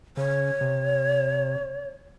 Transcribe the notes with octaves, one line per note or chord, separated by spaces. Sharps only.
C#3 C#5
C3